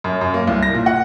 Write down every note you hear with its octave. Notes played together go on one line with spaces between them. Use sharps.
F#2
F#2
A#3
C2
A#6
A#2
F#5